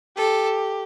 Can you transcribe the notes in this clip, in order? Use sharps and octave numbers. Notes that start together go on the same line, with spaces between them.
G4 A4